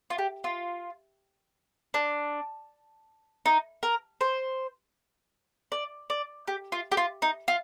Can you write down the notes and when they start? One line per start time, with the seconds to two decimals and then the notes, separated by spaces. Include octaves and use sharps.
0.10 F4
0.18 G4
0.44 F4
1.94 D4
3.46 D#4
3.83 A#4
4.21 C5
5.72 D5
6.10 D5
6.47 G4
6.72 F4
6.92 G4
6.97 F4
7.22 D#4
7.48 F4